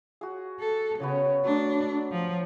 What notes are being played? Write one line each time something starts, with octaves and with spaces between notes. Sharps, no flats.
F#4 G#4
A4
C#3 B3 F#4 C#5
F#3 A3 D4
F3